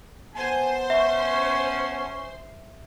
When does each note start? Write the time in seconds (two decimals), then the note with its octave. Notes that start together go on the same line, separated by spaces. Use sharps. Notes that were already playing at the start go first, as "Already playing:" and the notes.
0.35 B3 C5 G#5 A5 C6
0.90 C#4 E5